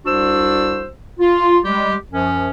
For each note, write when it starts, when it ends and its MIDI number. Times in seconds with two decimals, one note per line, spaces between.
0.06 0.88 36
0.06 0.88 62
0.06 0.88 66
0.06 0.88 72
0.06 0.88 88
1.19 1.58 65
1.65 1.95 55
1.65 1.95 56
1.65 1.95 67
2.11 2.51 42
2.11 2.51 53
2.11 2.51 61